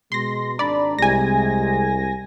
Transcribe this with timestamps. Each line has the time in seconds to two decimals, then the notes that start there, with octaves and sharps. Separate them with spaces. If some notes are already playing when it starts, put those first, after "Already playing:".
0.12 B2 G#3 C6 A#6
0.59 G#1 D4 D5 A#5 B5
0.99 C2 C3 G#3 G#5 A#6